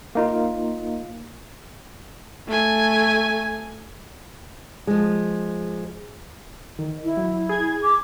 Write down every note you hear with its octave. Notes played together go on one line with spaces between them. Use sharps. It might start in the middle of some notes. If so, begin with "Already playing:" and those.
A#3 D#4 F4
A3 G#5
F3 G#3
D#3
E4
F#3
G#4 G#6
D6